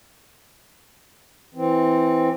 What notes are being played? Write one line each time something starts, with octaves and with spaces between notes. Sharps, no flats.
E3 C4